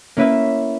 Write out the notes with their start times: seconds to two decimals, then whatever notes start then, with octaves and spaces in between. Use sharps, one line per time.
0.17 A#3 C#4 E4 B4 E5